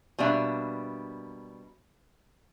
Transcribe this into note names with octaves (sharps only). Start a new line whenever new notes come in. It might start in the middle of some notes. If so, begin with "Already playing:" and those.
B2 G3 A#3 D4 E5